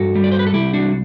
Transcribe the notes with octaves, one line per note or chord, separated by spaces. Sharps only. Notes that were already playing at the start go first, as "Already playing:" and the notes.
Already playing: G2 F#4 A4
G3
D5
C5
B4
A4
C2 E4 G4
D4 F#4